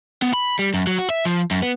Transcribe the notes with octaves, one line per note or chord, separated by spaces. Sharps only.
B3
B5
G3
F#2
F#3
F#4
E5
F3
F#2
B3